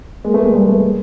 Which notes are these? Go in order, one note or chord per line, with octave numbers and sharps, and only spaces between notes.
G#3 A#3
A3 B3
G#3 A#3
G3 A3
A3 B3
G#3 A#3